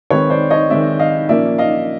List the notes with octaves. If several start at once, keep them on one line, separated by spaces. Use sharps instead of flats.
D#3 G#3 C4 B4 C#5
C5 D5
C#5 D#5
D#3 G#3 C4 D5 E5
D#5 F5
A#2 F3 A#3 C#4 D5 E5
D#5 F5